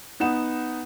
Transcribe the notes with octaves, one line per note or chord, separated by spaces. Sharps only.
B3 D#4 F#5 E7